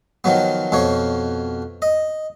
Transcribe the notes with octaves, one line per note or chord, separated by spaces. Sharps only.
D#3 F3 F#3 B3
F2 B2 F3 C#5
D#5